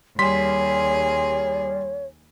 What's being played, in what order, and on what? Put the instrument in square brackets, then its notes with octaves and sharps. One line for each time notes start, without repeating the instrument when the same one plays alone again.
[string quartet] D#2 G#4 [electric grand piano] G3 C6 B6 [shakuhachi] C#5